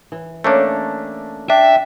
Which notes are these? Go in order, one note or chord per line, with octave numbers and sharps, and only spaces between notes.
E3
A3 A#3 C#4 D4
D4 E5 G5